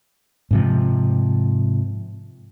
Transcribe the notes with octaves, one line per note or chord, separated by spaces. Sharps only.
G#2 C3 F3